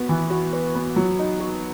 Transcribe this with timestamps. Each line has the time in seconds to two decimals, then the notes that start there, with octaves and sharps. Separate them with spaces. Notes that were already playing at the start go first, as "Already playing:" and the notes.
Already playing: B3 F#4
0.09 E3
0.30 F#4
0.53 B4
0.75 B3
0.96 F#3
1.19 D#4
1.40 F#4